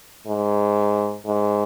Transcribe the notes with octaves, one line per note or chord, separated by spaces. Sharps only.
G#2
G#2